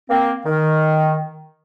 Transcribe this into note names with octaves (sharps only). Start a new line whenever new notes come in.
A#3 C4
D#3